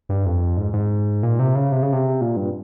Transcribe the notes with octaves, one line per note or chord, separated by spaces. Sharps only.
G2
F2
G#2
G#2
A#2
C3
C#3
C3
C#3
C3
A#2
G2